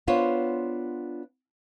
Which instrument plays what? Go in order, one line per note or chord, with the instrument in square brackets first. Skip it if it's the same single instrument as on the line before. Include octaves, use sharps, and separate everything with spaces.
[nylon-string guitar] B3 D4 F4 C5 C#5